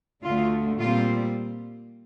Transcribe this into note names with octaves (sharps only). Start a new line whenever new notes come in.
D2 D3 A3 F4
A#2 G3 C4 F4